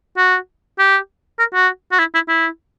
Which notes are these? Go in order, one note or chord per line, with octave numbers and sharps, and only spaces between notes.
F#4
G4
A#4
F#4
F#4
E4
E4
E4